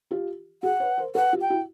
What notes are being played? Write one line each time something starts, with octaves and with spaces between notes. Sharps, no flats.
F4 G4
F#4 G#4 F#5
B4 C#5
A#4 C5
A4 B4 F#5
F4 G4
G5
E4 F#4